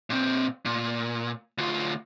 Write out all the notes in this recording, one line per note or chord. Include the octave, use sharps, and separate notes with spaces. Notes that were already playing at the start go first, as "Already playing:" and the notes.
A#2 C4
A#2
D2 F4